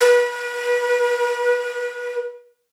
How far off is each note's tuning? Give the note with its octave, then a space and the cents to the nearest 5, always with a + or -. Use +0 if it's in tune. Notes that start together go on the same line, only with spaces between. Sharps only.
B4 -35